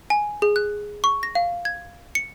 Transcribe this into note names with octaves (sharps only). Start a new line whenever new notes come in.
G#5
G#4
F#6
C#6
A#6
F5
G#6
C#7